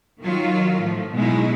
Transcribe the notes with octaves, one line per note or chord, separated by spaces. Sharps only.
D#3 F#3 F4
A2 F3
B2 F#3 G#3 D#4 E4